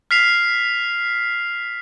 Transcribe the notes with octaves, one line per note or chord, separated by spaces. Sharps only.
F6 B6 C7 F7